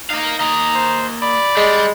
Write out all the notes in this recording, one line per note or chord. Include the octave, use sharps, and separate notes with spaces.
D#4 A#4 F5
A#3 D#5 A#5
C5
D5 B5
G3 G#3